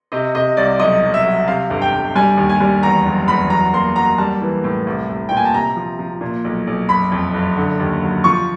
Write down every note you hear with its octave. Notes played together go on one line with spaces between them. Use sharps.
C3 D#5
C3 D#5
C2 D5
B1 D#5
B1
E5
F#3
C3 F5
G1
G5
G1
G3 G#5
D#2
G#5
G3
E2 A#5
F#1
E2 B5
F#3 A#5
A#3 C6
F#3 A#5
G3 A5
E3
A2
C2
C2
A#2 G5
G#5
A5
C3 A#5
F3
F3
A#2
B1
B1
F#1 B5
F2
F#1
D3
D#2
F#3
F3 C#6